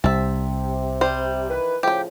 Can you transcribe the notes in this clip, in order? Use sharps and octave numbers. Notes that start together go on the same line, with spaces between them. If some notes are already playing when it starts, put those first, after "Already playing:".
C2 C3 E5 A5
G3 C5
D#3 E3 B4
A2 C#3 F3 G4 G5